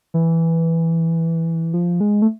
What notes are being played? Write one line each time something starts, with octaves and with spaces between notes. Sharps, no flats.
E3
F3
G#3
A3